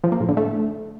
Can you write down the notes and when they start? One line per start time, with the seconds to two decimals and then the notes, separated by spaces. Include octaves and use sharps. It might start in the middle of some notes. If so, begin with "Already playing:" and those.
0.04 F3
0.12 A#3
0.20 A2
0.29 D3
0.37 A3